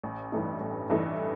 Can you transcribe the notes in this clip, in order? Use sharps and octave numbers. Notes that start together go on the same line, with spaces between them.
A1
G2 E3 A3 D#4
A1
G2 E3 A3 D#4